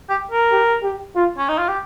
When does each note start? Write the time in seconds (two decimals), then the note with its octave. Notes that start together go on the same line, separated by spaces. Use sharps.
0.10 G4
0.31 A#4
0.52 G4
0.83 G4
1.15 F4
1.38 C#4
1.48 D#4
1.58 F4
1.68 G4